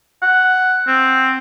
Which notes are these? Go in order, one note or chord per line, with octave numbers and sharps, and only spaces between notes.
F#5
C4